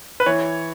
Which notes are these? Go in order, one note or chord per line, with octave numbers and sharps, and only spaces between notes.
B4
E3 C#5